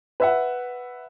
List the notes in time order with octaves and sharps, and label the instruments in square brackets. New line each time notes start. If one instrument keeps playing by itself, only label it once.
[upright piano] B4 E5 F#5